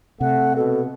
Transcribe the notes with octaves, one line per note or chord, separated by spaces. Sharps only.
C3 A3 F#5
B2 A4